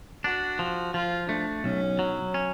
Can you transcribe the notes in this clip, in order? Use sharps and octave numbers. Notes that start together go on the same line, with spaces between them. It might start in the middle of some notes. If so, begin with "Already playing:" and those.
D4 F#4
F3
F3 F4
A3 D4
B1 C#4
F#3
C#4